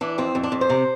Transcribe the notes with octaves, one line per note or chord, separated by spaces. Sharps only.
E3 D4
F2 C4
F2
D4
F2
C5
C3